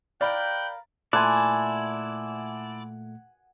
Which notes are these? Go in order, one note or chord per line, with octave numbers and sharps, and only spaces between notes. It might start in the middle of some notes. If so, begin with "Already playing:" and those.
A#4 D5 F5 G5 B5 F#6 G6
A#2 A3 E4 D5 F#5 G#5 A5 C6